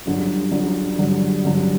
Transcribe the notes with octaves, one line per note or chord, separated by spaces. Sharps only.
G1 G2 D3 F#3
G1 G2 D3 F#3
G1 G2 D3 F#3
G1 G2 D3 F#3